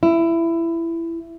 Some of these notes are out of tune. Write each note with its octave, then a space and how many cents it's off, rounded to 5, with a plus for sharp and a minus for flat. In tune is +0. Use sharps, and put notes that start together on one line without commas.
E4 +15